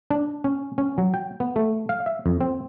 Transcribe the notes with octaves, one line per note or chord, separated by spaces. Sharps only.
D4
C#4
C#4
F#3
G5
B3
A3
F5
E5
F2
C4